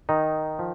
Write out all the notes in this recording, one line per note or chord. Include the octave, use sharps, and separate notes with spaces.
D#3 D#4
F3